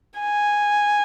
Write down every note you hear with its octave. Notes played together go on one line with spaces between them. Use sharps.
G#5